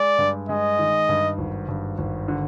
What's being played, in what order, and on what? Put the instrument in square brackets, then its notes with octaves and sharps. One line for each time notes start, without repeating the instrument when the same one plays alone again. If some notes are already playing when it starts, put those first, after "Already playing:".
Already playing: [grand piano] G#3 [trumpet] D5
[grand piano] G2
[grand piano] G#3 [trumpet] D#5
[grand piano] D#3
G2
G#1
G2
G#1
D3